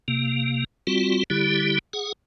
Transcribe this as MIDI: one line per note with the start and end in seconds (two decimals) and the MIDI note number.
0.08 0.64 48
0.08 0.64 58
0.87 1.23 55
0.87 1.23 60
0.87 1.23 65
0.87 1.23 66
1.30 1.79 50
1.30 1.79 55
1.30 1.79 64
1.30 1.79 67
1.93 2.13 68
1.93 2.13 78